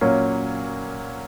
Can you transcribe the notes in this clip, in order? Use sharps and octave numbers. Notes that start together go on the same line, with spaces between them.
A#2 F#3 A#3 C#4